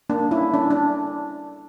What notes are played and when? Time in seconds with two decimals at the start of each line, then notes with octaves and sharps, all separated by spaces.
0.09 A#3 D4
0.31 C#4 E4
0.54 C#4 D4
0.70 D4